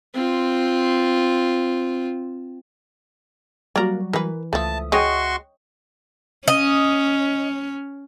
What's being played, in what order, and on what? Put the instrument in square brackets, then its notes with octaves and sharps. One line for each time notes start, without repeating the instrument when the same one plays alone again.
[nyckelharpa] C4 F4
[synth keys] F#3 G3 F#4 [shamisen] A#3 A#4 [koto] D5 A#5
[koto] E3 [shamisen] A#4 B4
[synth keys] C#2 E5 D#6 [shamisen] F3 A3 [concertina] A5
[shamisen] G#3 [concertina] F#4 C6 C#6 [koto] C#5 D#5 G5
[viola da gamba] C#4 [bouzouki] D#5